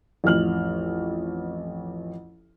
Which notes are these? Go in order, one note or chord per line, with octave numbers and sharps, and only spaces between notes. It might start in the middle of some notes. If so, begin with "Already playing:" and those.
A1 F2 F6 F#7